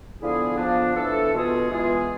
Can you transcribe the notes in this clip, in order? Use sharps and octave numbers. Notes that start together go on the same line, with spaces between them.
D3 F3 B3 E4 G#4
F3 B3 D4
E3 A3 D4 A4
B2 B3 F4 G#4
E3 G#3 B3 F4 G#4